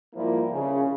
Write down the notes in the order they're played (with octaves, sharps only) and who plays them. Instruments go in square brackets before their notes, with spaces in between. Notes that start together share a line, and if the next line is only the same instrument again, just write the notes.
[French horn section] G#2 F3 G3 A#3 E4 F4
C#3